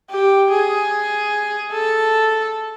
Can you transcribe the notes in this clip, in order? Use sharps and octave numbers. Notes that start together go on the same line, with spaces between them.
G4
G#4
A4